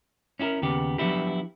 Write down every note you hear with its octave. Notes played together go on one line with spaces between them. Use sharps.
C#4 E4 G4 A#4
D#2 C#3 B3 G4
F3 F#3 B3 D4 E4 G4